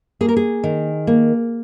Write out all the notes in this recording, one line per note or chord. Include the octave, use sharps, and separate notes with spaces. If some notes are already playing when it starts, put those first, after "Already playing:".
A#3 G#4
A#4
G#4
D#3
A#3